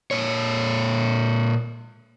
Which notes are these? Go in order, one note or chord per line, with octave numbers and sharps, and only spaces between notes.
A#2 C#5